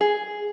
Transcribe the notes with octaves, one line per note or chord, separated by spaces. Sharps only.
G#4